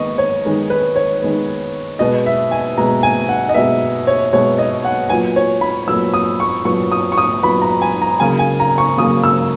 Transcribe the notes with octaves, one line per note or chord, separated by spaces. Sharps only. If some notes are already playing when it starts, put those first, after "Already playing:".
Already playing: D#3 G#3 B3 D#5 C#6
C#5
D#3 G#3 B3
B4
C#5
D#3 G#3 B3
B2 G#3 B3 D#5
E5
G#5
B2 G#3 B3 A#5
G#5
F#5
D#5
B2 G#3 B3 E5
C#5
B2 G#3 B3 C#5
D#5
F#5
A#2 F#3 B3 G#5
C#5
B5
A#2 F#3 B3 E6
D#6
C#6
A#2 F#3 B3 C#6
D#6
C#6
D#6
A#2 F#3 B3 B5
A#5
G#5
A#5
C#3 F#3 A#3 G#5
G#5
A#5
C#6
C#3 F#3 A#3 D#6
E6